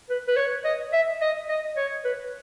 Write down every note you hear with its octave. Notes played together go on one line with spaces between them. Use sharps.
B4
B4
C#5
D#5
E5
D#5
D#5
C#5
B4